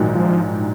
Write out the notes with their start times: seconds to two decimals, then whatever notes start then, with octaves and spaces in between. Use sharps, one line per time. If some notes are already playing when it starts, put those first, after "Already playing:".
Already playing: A#1 G#2 D#3 F#3
0.15 F3